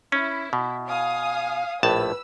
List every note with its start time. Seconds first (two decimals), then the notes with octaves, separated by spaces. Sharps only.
0.12 C#4 E4
0.53 B2
0.88 F5 G#5 D#6
1.83 A#1 A2 B4 A5 E6